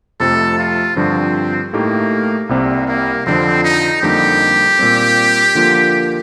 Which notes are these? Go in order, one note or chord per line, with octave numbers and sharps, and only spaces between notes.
F2 C3 F3 A3 A4
F4
G2 D3 F3 C4
A2 A3 A#3 D#4 G4
C2 C3 G3 A#3 C4
A#3
F2 D3 F3 C4
D#4
F2 D3 G3 A#3 D#4 G4
A#2 G3 C4
D3 F3 A#3 F4